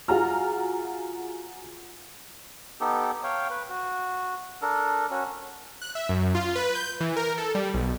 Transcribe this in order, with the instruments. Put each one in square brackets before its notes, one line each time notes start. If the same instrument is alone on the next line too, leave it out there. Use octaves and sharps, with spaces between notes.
[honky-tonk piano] F4 F#4 G#4 A#5 F6
[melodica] B3 D#4 G4 A4
C#5 F5 G5
B4
F#4
D4 A4 A#4
C#4 F#4
[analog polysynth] F#6
E5
F#2
F4
B4
G6
E3
A#4
A4
G3
B1